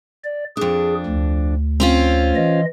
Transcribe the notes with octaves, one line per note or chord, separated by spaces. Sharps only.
D5
F2 D4 G#4
D2
C4 C#4 F4
E3 D#5